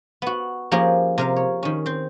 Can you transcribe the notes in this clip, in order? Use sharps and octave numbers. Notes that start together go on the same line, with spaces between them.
B3 F#4
F3 A#3 C#4 G4 G#4 A#4
C3 A#4 F5
C#5
D#3 C#4
C4 C5